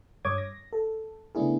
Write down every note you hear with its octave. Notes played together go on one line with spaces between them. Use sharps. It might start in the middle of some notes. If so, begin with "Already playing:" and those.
G2 C#5 D6 D#6 G#6
A#6
A4
C#3 A3 B3 D4 E4 G#4